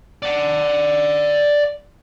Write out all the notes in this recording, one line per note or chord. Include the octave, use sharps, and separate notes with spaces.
D5 F#5